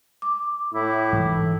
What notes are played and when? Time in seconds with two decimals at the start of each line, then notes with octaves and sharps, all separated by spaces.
0.22 D6
0.74 A2 E4
1.13 G#2 E3